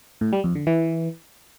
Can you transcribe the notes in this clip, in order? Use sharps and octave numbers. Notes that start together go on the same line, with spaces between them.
A2
G3
F2
D3
E3